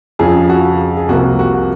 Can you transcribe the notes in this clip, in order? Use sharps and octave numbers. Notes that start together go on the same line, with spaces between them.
F2 C#3 F3 G#4
F#4
G#4
C2 C3 F3 A#3 F#4
F#4